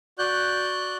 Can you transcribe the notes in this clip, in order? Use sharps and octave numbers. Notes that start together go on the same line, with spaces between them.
F#4 D5 F#6 G6